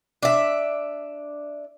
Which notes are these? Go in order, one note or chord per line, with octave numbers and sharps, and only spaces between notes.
D4 E5